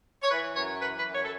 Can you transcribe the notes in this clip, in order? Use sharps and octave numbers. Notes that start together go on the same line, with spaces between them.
C#5
E3 B4
F#2 C#5
E3 B4
B4
F#2
C#5
A4